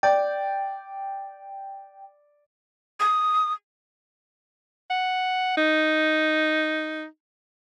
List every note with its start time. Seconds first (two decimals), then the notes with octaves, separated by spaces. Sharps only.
0.03 D5 G5
3.00 D#6
4.90 F#5
5.57 D#4